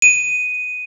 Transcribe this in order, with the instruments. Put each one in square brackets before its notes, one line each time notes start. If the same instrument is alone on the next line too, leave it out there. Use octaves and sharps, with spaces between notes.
[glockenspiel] D#7